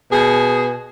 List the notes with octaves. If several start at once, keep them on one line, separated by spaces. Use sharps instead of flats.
B2 G#4